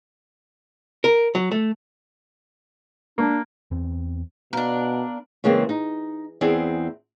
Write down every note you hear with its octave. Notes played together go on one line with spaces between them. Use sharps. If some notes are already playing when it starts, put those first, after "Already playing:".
A#4
F#3
A3
A#3 D4
E2 C4
B2 B3 D4 A#4 F5
C#3 E3 G#3 A#3 C4
D#4
E2 C4 E4 G#4 D5